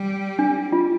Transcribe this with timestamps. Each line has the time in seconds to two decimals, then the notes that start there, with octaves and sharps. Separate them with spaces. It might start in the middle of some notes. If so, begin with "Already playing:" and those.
Already playing: G3
0.39 D4
0.72 F4